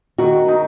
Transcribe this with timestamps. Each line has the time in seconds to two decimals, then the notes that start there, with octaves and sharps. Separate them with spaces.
0.18 D#3 F#4
0.48 D#4